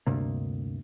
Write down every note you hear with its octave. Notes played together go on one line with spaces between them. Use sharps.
D2 G2 C3 A#3